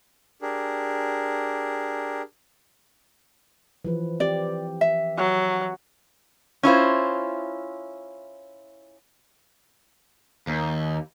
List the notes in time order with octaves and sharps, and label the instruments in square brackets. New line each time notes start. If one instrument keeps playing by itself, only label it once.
[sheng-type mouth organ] D4 G4 G#4 A#4
[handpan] E3 F3 B4
[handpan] C4 G4 [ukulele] D5
[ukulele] E5
[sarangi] F#3
[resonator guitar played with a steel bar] C#4 E4 F4 C5
[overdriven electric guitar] D#2